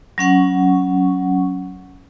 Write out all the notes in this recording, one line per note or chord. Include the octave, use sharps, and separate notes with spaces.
F#3 C#4 F#5 C#6